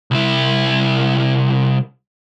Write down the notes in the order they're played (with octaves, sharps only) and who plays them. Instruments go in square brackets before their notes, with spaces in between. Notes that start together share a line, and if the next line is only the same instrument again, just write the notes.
[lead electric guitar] C2 E4